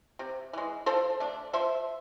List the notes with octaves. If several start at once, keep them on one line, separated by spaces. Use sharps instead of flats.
C3
E3 G#3
F3 A4 C5
A3 D4
F3 C5 E5